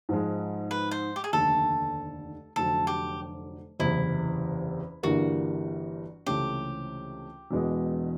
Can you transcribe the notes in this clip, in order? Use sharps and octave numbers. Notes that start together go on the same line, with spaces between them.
G#2 F3 G#3
B4
C5
G4
G#4
F1 D#2 D3 A4
F1 F2 D3 F#3 A4
G4
F#1 E2 C3 E4
G1 G2 E3 G3 A#3 F#4
C#2 C3 E3 A3 C#4 G4
E1 E2 B2 G#3 B3